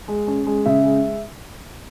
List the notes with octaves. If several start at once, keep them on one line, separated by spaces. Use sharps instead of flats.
G#3
C#4
G#3
C#3 E5
G#3